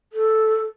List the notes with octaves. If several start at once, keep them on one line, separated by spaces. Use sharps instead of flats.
A4